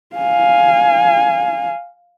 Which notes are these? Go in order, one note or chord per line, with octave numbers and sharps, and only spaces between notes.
F5 G#5